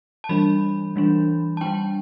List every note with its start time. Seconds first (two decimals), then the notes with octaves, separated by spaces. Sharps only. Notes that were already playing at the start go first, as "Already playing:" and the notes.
0.24 A5
0.29 E3 G3 D4 B5
0.96 E3 G3 D4
1.57 A5
1.61 G3 D4 G5